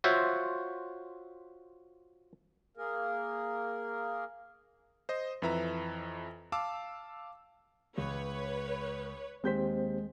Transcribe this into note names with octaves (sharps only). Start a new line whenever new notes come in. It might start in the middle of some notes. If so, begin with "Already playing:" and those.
F4 F#4 C5 C#5 E5
A#3 G#4 A#4
C5 D#5
F2 E3 B4 E5 A#5
F5 A5 D6 E6
C#2 B4 C#5
D#2 G#3 C4 G4 C5 G6 B6